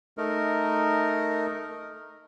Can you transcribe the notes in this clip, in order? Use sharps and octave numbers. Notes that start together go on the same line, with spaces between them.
A3 D#4 A#4